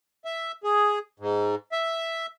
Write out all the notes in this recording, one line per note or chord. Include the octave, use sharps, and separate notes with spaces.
E5
G#4
G#2
E5